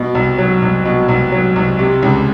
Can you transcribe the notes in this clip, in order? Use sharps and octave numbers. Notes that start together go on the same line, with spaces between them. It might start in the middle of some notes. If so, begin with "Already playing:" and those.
Already playing: B2
C2
F#3
C2
B2
C2
F#3
C2
C3
C#2